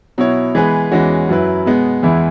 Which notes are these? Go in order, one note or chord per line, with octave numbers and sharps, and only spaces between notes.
B2 F#3 E4 C#5
E3 G#3 B3 G#4 B4
E2 E3 G#3 C#4 F#4
F#2 F#3 E4 B4
B2 G#3 B3
E2 E3 G#3 E4